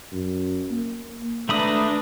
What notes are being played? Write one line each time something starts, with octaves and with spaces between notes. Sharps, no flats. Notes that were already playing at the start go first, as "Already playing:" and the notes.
F#2
A#3
G#1 A3 D4 B4 A#5 B5 D#6